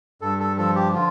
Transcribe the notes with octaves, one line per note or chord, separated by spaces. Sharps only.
G2 A4
A4
F3 A4
G4
D3 F4